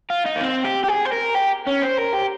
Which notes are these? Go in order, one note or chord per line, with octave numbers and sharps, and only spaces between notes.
F4
D#4
A#3
C4
G4
G4
G#4
C5
A#4
G4
C#4
C5
A#4
G4